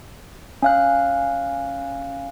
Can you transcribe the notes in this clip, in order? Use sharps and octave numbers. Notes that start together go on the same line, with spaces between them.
C#4 F5 F#6